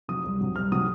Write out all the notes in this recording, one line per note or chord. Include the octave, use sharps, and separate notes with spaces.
C3 F#3 D#6
C2
C3 F#3
C2 F6
C3 F#3 D#6